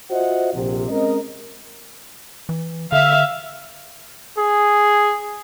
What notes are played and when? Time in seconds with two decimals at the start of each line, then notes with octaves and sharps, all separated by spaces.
0.10 F4 F#4 C5 D#5 E5 F#5
0.53 A#1 C3
0.89 G#3 C4 C#4 A#4 D#5
2.49 E3
2.92 D3 E5 F5
4.38 G#4